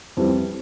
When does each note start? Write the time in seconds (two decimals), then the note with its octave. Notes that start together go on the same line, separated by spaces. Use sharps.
0.17 F2 E3 G3